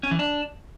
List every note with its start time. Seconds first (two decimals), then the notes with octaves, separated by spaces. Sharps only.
0.03 C#4
0.11 E3
0.19 D4